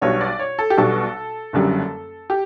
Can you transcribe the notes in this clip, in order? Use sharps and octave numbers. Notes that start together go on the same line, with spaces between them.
B1 B2 G3 D4 C#5
D5
C#5
A4
G4
B1 B2 G3 D4 A4
F#1 F#2 D3 G3
G4